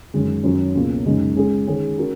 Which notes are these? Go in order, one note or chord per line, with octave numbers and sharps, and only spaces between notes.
F#2 D#3 G#3
F#2 D#3 F#3 C#4
C#2 B2 A#3
F#2 C#3 G#3 D#4
C#3 G#3 C#4 G#4
D#3 G#3 C#4 G#4
C#4 F#4 A#4